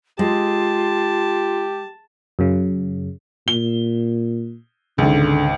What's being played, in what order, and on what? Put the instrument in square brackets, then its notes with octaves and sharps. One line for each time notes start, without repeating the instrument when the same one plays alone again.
[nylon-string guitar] G#3 [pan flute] F4 [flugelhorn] G4 [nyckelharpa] A5
[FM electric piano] F#2 C#3
[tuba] A#2 [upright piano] G7
[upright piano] G#1 C#2 [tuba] D3